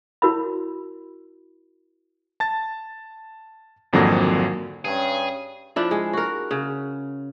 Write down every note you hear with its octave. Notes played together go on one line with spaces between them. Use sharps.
E4 F#4 A#4 C#5 B5
A5 A6
G#1 F2 D3 F#3 A#3 A#6
G2 C#4 G#4
F3 D4 E4
G#3
F#4 A#4
C#3